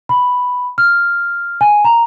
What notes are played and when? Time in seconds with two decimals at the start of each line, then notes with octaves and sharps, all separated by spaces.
0.09 B5
0.78 F6
1.61 G#5
1.84 A#5